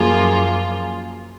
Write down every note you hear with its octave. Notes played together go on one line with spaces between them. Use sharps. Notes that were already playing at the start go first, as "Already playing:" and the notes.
Already playing: F#2 F3 A#3 F4 G#4